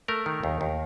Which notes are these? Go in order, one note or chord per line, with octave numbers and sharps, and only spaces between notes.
A3 A#4
D#3
D#2
D#2